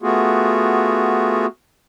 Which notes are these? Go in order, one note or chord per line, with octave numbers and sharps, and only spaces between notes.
A3 B3 F4 F#4 G#4